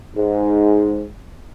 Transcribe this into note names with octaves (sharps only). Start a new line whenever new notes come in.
G#2